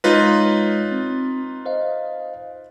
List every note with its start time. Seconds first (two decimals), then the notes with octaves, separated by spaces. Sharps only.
0.04 G#3 D#4 F4 B4 C#5 A#6
0.92 C4
1.66 C5 D#5 F5